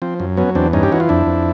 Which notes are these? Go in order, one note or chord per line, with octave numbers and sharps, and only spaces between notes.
F3 C4
F#2
F#3 B3 C#4
E2 C4 D4
G2 C#4 D#4
G4
E3 F#4
F4
F2 D4 E4
F2